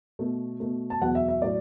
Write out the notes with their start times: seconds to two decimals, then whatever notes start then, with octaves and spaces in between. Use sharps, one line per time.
0.19 B2 A3
0.60 B2 A3
0.90 A5
1.01 E2 B2 F#3 F#5
1.15 E5
1.28 E5
1.42 A2 F#3 D5